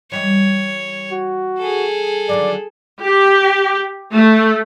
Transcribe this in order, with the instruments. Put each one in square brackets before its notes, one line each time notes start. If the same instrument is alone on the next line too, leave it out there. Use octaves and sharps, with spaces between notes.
[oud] E3 G3 D#5 [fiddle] C#5
[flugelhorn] F#4
[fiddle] G#4 A4
[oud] D3 D#3 F#3 [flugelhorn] D5
[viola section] G4
A3